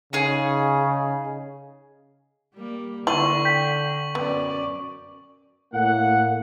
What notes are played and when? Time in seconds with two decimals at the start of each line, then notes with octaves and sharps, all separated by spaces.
0.13 C#3 D#4 G#4
2.55 G3 A#3
3.07 D3 E4 F4 C#6 F#7
3.45 G5 G6 B6
4.15 F#2 B3 D5
5.73 A2 A#3 F#5